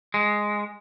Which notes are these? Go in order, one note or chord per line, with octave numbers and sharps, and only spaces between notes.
G#3